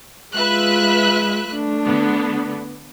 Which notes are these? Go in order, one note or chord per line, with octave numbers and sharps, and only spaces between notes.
G#3 F4 B4 E5 F#6
A3 D4
D3 B3